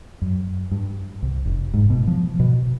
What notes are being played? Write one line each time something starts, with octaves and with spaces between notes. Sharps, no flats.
F#2
G2
C2
F1
G#2
B2
F3
B2